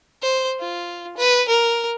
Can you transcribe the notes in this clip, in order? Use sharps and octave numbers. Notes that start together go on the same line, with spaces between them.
C5
F4
B4
A#4